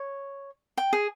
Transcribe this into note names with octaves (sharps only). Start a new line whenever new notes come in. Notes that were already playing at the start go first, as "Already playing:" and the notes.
Already playing: C#5
G5
G#4